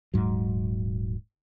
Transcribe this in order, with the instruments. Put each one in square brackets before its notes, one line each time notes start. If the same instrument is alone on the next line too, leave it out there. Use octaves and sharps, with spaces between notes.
[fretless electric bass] D#1 G#2 F#3